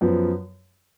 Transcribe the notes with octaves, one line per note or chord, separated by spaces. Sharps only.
F#2 F3 B3